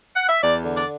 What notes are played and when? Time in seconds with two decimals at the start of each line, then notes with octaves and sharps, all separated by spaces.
0.15 F#5
0.29 E5
0.42 E2 D5
0.64 D3
0.74 D5